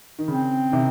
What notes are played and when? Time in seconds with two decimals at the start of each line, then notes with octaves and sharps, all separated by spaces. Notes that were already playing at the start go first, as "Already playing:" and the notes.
0.19 D#3
0.27 C#3 C4
0.72 C3 D#3